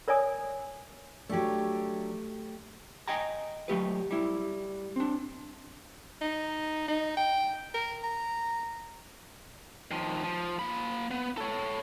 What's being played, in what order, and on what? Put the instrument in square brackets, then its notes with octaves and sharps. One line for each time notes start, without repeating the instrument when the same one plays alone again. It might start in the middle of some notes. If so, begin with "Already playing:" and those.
[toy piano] A#4 C#5 D5 G#5 D#6
[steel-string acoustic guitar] F#3 D4 [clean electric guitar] A3 G4
[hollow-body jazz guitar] D#5 G5 G#5 A#5
F#3 A3 G4 B4
G3 E4
C4 D4
[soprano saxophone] D#4
D#4
G5
A#4
A#5
[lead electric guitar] D#3 F3
F3
A#3 B5
B3
A4 C#5